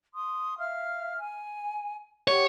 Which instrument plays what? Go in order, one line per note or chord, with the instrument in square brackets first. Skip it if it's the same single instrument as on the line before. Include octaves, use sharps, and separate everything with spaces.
[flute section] C6 D#6
E5 F5 F6
G#5
[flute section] G4 F#5 [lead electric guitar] C#5